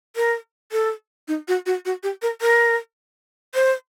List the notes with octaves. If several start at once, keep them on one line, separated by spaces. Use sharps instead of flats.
A#4
A4
D#4
F#4
F#4
F#4
G4
A#4
A#4
C5